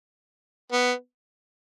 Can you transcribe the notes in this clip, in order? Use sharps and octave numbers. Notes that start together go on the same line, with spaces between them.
B3